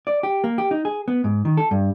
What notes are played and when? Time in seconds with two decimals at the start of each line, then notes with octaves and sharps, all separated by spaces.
0.07 D5
0.23 G4
0.44 A#3
0.58 G4
0.71 D#4
0.85 G#4
1.08 B3
1.24 G#2
1.45 D#3
1.57 A4
1.71 G2